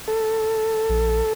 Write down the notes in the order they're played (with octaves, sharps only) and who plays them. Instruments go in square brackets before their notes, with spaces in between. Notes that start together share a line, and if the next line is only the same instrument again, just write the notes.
[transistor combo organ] A4
[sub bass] A#1